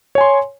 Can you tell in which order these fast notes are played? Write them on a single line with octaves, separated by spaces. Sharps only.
C#5 G#5 C6